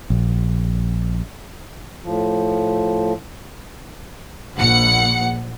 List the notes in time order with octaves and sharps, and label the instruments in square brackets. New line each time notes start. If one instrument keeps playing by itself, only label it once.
[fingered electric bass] A#1
[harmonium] A2 F3
[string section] A#1 F#5 C#7